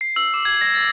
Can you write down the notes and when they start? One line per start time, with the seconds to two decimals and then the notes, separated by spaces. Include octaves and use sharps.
0.01 C7
0.16 E6
0.34 D6
0.45 G#6
0.61 A#6
0.75 A6